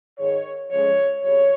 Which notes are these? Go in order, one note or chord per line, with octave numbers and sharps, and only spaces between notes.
G#2 D#3 G#3 C#5
F2 C#3 F3 G#3 C#4 C#5
F2 C#3 G3 C#5